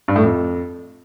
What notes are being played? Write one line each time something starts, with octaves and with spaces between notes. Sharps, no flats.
G2
A2
F2